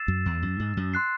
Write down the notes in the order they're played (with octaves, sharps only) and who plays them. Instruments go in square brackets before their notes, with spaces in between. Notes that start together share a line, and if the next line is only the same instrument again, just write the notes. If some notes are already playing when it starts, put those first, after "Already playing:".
Already playing: [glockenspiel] E6 A6 C7 E7
[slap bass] F#2
E2
F#2
G#2
F#2
[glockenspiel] C6 F#6 C7